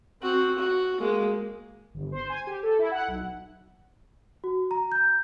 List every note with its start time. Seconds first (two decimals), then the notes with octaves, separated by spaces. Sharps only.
0.22 C4 F#4
0.58 F#4
1.00 G#3 A#3
1.94 G1
2.12 C5
2.30 G#5
2.47 G4
2.63 A4
2.79 E4
2.91 F#5
3.08 B1
4.44 F#4
4.71 A#5
4.92 G6